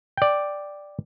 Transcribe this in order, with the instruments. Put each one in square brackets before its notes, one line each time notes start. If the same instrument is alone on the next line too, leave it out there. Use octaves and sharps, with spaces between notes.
[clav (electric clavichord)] D5 G5